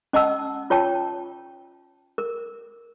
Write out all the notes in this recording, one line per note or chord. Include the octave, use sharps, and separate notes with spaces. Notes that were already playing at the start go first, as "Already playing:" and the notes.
C#4 D#5 F#5 A5 E6
F4 C#5 G5 A5
A#4